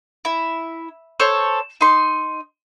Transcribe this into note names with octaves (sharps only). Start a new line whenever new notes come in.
E4
A4 C5 C#5
D#4 C6